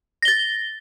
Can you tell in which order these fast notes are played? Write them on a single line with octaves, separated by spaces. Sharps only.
A#6 G7 A6